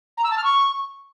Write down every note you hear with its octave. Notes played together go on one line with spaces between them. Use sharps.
A#5
E6
A5
F6
C#6